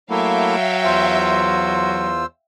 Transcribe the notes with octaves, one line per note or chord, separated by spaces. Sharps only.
F#3 A3 A#3 E4 E5 F5 G5
E2 F4 C5 E6